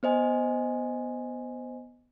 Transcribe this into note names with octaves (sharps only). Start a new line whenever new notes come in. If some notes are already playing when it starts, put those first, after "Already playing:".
B3 C5 D#5 G#5